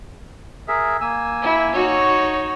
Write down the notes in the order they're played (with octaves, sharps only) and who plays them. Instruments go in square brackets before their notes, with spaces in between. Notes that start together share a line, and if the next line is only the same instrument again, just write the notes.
[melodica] G#4 A#4 E5
A#3 G#5 E6
[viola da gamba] E4
D#4 F#4 C#5